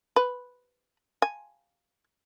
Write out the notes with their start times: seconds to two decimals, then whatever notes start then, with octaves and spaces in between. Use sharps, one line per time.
0.16 B4
1.22 G#5